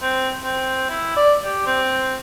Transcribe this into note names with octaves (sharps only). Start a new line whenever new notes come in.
C4
C4
E4
D5
G4
C4